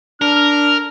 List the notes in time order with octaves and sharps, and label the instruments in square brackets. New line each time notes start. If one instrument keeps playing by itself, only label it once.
[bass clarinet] D4 [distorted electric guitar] A#4 [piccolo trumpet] F6